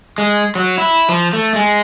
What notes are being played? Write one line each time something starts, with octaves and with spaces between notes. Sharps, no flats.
G#3
F#3
E4
F3
A3
G#3